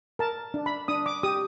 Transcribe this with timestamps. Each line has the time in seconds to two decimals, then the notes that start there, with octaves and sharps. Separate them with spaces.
0.19 A#4 A5
0.54 D4
0.66 B5
0.88 D4 D#6
1.06 D6
1.23 G4 D#6